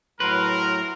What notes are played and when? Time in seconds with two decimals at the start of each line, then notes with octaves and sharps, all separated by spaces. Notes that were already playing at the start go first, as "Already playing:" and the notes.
0.20 A2 F#3 A#4 B4 C6